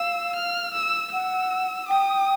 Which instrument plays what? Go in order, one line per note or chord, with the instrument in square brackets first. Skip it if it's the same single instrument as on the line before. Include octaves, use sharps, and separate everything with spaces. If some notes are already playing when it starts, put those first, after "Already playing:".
Already playing: [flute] F5 [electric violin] E6
[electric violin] F6
E6
[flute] F#5 [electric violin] E6
[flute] G5 [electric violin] D#6